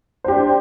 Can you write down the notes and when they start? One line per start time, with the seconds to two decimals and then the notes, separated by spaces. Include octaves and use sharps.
0.24 C5
0.28 G4
0.32 D4